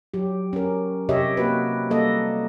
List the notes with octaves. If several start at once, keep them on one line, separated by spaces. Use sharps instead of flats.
F#3 G4
C#4 A#4
C3 G4 C#5 D#5 E5
A#3 F#4 B4
G3 A#3 A4 D#5